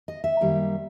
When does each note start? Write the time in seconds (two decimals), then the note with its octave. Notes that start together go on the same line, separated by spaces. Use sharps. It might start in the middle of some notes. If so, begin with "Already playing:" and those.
0.08 D#5
0.24 E5
0.40 F#2 D#3 G3 A#3